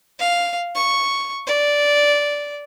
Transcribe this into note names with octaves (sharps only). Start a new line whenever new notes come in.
F5
C#6
D5